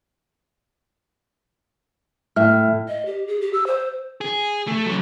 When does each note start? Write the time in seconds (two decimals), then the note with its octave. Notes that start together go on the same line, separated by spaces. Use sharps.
2.36 A2 E5 F6
2.88 D#5
3.06 G4
3.27 G#4
3.41 G4
3.53 E6
3.67 C5
4.21 G#4
4.68 A3
4.86 C#3 F#3